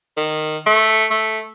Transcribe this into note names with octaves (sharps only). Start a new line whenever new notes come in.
D#3
A3
A3